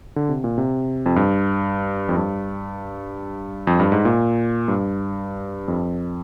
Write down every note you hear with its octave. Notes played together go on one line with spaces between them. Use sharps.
D3
C3
A#2
C3
F2
G2
F2
G2
F2
G2
G#2
A#2
G2
F2